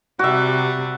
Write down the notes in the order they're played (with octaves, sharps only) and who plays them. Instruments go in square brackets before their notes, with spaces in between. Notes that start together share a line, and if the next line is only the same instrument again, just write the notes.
[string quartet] C3 G3 [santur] F#4 E5